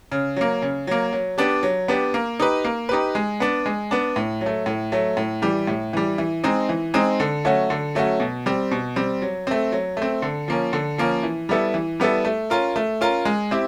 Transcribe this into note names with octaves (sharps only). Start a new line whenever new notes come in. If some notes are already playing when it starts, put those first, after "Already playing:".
C#3
F#3 A#3
C#3
F#3 A#3
F#3
B3 D4 G4
F#3
B3 D4 G4
A#3
D#4 G4 B4
A#3
D#4 G4 B4
G#3
B3 D4
G#3
B3 D4
A2
F#3
A3
A2
F#3 A3
A2
E3 G3
A2
E3 G3
E3
G#3 C4 D#4
E3
G#3 C4 D#4
D3
F#3 A3 C#4 F#4
D3
F#3 A3 C#4 F#4
B2
G3 C4
B2
G3 C4
F#3
A3 C4
F#3
A3 C4
D3
F3 A#3 C#4
D3
F3 A#3 C#4
E3
G3 B3 E4 A4
E3
G3 B3 E4 A4
A3
C#4 F4 A#4
A3
C#4 F4 A#4
G#3
C4 E4 G4